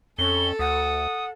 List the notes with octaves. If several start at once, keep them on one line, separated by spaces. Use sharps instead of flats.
F2 C#4 A4 G7
D2 F#5 D#6